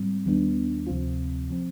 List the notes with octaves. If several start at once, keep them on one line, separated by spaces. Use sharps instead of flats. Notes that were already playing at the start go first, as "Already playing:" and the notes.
Already playing: G#2 G3 C4
D#2 D#3 G3 B3 D4
D2 C3 F3 C4 F4
F3 C4